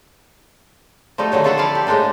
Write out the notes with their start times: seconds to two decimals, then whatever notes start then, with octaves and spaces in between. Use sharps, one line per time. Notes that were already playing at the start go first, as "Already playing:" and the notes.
1.18 F3 G3 A3 D#4
1.32 D3 D#3 F#3 C#5
1.44 A#3 F4 A4 E5 F#5
1.58 F3 E4 D5 F5
1.75 G4
1.87 A2 G#3 A#3 D4 D#4